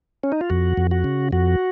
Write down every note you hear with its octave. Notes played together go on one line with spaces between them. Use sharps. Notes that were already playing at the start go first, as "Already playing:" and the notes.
C#4
D#4
F4
F2 F#4
F2
F#4
C#3
F2 F#4